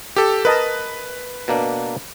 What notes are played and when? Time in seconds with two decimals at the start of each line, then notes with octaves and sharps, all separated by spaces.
0.16 G4 A4
0.45 A#4 B4 D#5 A5
1.48 B2 A#3 D4